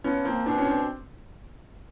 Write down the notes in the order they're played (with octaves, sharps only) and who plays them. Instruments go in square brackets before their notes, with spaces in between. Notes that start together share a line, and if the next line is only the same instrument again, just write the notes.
[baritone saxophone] F3 [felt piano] B3 C#4
[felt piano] A#3 C4
[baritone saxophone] B2 [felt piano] C4 D4
[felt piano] C#4
C4 D4